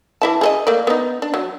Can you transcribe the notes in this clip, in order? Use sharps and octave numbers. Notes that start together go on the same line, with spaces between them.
E3 E4 A5
G#4 A4 D#5
A3 A#3 D5
B3 D#4
D4
F#3